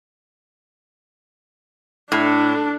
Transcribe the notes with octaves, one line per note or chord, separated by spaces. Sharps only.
A2 D4